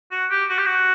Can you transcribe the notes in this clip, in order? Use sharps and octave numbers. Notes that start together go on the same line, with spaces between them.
F#4
G4
F#4
G4
F#4